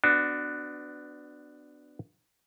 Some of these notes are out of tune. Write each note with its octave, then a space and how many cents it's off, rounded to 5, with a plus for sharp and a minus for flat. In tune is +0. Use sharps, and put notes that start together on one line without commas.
B3 +30 D4 +10 F#4 +0